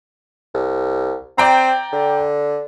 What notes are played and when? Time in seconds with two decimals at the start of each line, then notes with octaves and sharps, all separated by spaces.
0.54 C2
1.38 C4 D5 G5 A#5
1.93 D3